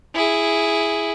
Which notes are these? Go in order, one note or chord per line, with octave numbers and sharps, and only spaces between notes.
E4 G#4